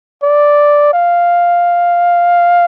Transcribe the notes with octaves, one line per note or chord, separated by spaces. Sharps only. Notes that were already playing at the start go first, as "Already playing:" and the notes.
D5
F5